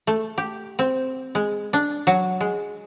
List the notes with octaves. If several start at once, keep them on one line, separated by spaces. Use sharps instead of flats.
A3
G4
C4
G#3
D4
F#3
G#3